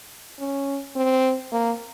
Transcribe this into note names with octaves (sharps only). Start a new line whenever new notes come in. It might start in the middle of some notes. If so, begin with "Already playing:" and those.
C#4
C4
A#3